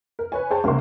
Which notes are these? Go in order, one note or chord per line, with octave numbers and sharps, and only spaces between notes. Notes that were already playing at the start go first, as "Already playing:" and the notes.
A#4
B4 C#5 G#5
G#4 C5 C#5 G5 A5
C2 C#3 G#3 A#3 F#5 C6